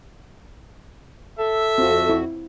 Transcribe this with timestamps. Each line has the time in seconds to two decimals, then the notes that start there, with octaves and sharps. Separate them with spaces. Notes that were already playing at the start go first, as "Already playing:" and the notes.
1.39 A4 E5
1.78 F2 C4 F4 F#4
2.10 E4